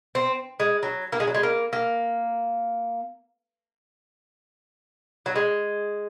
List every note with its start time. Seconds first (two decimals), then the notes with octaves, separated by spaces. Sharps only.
0.15 C4
0.60 G#3
0.83 F#3
1.12 A#3
1.20 G#3
1.27 F#3
1.34 G#3
1.43 A#3
1.73 A#3
5.26 F#3
5.36 G#3